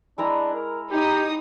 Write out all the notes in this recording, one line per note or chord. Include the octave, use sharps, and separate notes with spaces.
G#3 D4 E4 A#5
A#4
D#4 G4 D#6